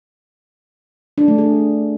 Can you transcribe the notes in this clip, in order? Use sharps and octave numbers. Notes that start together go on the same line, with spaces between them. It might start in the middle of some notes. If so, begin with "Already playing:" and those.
D4
A3
G#4